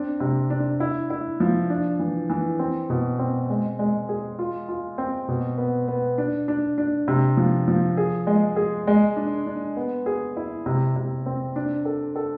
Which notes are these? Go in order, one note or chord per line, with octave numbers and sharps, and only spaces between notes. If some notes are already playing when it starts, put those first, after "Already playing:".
Already playing: C4 D4
C3
D4
E4
E4
F3
D4
E3
E3
C4
B2
C4
G#3
G#3
G#4
F4
F4
C4
B2
B3
B3
D4
D4
D4
C3
F3
F3
G#4
G#3
G#4
G#3
D4
D4
B3
G#4
E4
C3
C3
C4
D4
A4
A4